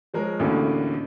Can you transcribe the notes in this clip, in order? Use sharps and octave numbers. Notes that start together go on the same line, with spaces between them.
F3 G#3 A#4 C#5
A1 D2 A2 A#3